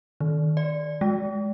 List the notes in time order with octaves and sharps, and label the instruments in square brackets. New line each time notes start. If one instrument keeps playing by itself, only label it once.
[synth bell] D#3
D5
G#3